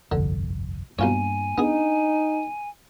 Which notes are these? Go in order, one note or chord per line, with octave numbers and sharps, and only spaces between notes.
G1 C2 F2 D3
B1 G2 A#3 F4 C#5 G#5
B3 D4 D#4 G#4